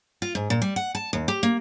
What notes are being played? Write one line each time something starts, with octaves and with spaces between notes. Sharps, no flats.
F4
G#2
A#2
G3
F#5
A5
D#2
G4
A#3